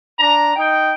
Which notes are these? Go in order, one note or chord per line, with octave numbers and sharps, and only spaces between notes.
D4 A#5
D#4 G5